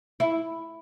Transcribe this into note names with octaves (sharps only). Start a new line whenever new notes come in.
E4